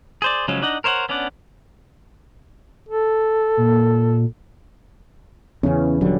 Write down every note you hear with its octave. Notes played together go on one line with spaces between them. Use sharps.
G#4 C5 D5
C#3 F3 F#3 G#3 C#4
D4 D#4 D#5 F#5
A#4 C5 C#5 E5 F#5
B3 C#4 D4 D5 F#5
A4
A#2
E2 C#3 E3 C#4
D#1 D3 F#3 G3